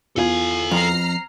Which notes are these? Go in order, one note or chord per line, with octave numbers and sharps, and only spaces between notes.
E2 F4 A4 G#5 G#6
F2 A#5 F6 C7